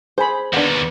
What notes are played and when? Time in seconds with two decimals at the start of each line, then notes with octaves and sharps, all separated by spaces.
0.18 G#4 C5 G#5 B5
0.53 D#2 D3 B3 D4